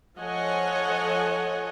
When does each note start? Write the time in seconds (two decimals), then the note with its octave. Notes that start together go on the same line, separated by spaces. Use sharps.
0.18 F3 A4 C#5 D#5 F#5 G#5